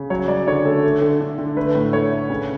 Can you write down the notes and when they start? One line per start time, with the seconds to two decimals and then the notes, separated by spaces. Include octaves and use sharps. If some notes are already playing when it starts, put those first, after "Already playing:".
Already playing: C#3
0.10 F#3 C#5
0.28 F#3 D5
0.47 D3 C#5
0.65 A3 A4
0.83 A3
1.01 D3
1.21 D3
1.38 D3
1.56 A3 B4
1.75 A2
1.93 A3 C#5
2.12 A3
2.30 C#3